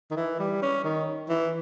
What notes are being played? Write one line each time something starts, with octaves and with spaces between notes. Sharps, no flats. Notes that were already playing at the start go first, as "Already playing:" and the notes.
D#3
E3
G3
C#4
D#3
E3